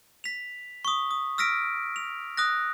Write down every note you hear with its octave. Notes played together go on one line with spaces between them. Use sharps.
B6 F7
C#6 D#6
D#6
E6 F6 A#6 B6 D7
F7
D#6 F#6 A#6